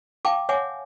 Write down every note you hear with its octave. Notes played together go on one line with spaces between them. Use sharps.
F5 G5 A5 D6
C#5 E5 F#5 G#5 D6